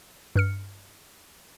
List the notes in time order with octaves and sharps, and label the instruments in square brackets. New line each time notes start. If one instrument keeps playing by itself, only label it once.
[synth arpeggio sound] G2 F6 C#7